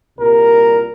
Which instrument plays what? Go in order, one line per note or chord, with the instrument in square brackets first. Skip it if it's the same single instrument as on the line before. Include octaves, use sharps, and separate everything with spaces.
[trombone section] C2 A#2 G3 A#3 A#4